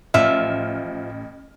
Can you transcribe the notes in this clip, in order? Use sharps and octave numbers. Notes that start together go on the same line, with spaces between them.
A1 F3 E5 F6